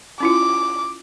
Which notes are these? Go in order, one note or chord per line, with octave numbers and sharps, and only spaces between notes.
C#4 E4 F4 D6